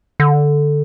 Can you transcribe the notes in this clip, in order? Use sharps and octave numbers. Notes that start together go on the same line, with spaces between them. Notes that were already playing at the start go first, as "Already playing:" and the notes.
D3